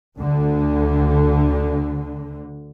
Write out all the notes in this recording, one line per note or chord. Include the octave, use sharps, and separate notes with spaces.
D2 D3